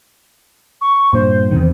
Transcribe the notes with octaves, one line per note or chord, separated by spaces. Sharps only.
C#6
G2 A#2 C5
E2 C3 D#3